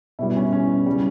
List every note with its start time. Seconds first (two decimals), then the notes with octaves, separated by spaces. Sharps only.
0.19 B2 G3 E4
0.36 C#4
0.52 C#4
0.86 C#3 G3